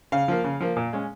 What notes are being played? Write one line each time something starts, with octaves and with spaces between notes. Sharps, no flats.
C#3 F5
F3 A#3
C#3
F3 A#3
A#2
G#3 C#4